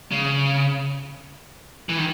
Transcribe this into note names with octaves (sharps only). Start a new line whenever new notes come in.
C#3
E3
D#3